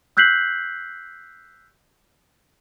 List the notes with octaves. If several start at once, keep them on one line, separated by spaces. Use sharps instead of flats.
E6 F#6 G6 B6 C7 F#7